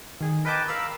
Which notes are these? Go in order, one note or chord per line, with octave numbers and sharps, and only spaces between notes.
D#3 G#4
A#4 B4 D#5 G5 A5 D6
A#4 F5 B5 E6